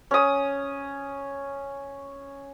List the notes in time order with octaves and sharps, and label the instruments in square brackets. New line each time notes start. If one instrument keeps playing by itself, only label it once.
[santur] C#4 D#6